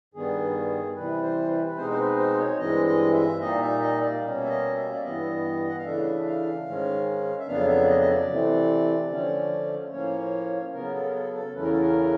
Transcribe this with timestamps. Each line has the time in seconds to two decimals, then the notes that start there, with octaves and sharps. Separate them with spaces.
0.14 G2 D#3 G3 B3 G#4
0.96 C3 E3 G3 B4
1.23 C5
1.50 B4
1.67 B4
1.77 B2 G#3 C4 D#4 C5
1.91 C5
1.97 B4
2.18 C5
2.39 C#5
2.58 G2 E3 G#3 C4 D#5
2.86 D#5
3.13 E5
3.40 A#2 G3 A#3 D#4 D#5
3.61 E5
3.81 D#5
4.01 D5
4.22 B2 G3 A#3 C#4
4.44 E5
4.49 D#5
4.76 E5
4.92 D5
5.03 G2 E3 G3 B3 D#5
5.69 F#5
5.78 F5
5.85 C#3 E3 A3 D4 E5
6.25 F5
6.66 G#2 D#3 G#3 C#4
7.39 E5
7.47 F2 C#3 F#3 B3 D4 F5
7.67 E5
7.84 D5
7.89 D#5
8.00 D#5
8.09 D5
8.30 C3 E3 A3 C4
9.10 D3 F3 A3 C#4
9.91 A2 F3 A#3 C#4 C#5
10.74 C#3 F#3 B3 A#4
10.94 A4
11.08 A#4
11.14 A4
11.35 A4
11.55 E2 C#3 E3 A3 C#4 B4
11.63 A#4
11.72 A4
11.80 A#4